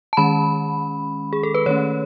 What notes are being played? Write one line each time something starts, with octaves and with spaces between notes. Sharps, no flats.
A5
D#3 G#3 C#4 B5
G#4
A4
B4
D#3 A3 C#4 C#5